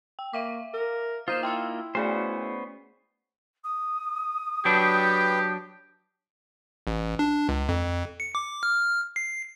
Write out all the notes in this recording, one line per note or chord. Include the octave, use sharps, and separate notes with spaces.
G5
A#3 E5 F5 D6
A#4
A#3 D#4 F4 C5 D#6 D#7 E7
E4 G5 C6 E6
A3 B3 C#4 G#4 C5 D5
D#6
F#3 D4 G4 B4 G5
A1
D4
C#2
F2
C#7
D6
F6
C7